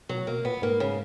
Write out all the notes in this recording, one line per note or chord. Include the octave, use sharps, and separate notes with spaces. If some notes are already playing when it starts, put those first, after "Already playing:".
B2 F#3
B2 A#3
A#2 B3
G#2 A#3
C#3